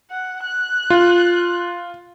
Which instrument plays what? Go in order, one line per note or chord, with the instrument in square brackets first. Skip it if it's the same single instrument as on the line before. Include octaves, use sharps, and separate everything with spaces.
[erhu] F#5
F#6
[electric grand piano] F4